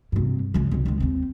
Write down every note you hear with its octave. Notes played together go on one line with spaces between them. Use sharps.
G2 C3
C#3 G#3
C2 C#4
C#2 G#3
D#2 C4